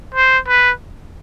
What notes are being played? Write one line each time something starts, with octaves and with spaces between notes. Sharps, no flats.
C5
B4